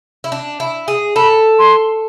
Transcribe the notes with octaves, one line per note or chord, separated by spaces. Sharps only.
E4
D4
E4
G#4
A4 B5
C6